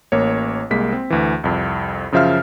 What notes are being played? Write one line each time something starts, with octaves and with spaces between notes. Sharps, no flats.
A1 A#3 C#5
C2 G#3 A#3 B6
C4
D2 E3
C2 F2
F#2 C#3 F3 E5 F5 F6